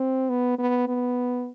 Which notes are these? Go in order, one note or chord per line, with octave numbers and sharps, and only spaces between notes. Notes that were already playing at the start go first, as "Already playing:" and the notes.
Already playing: C4
B3
B3
B3